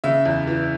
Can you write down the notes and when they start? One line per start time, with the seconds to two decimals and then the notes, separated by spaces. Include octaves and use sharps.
0.04 C#3 E5
0.25 E2
0.47 E3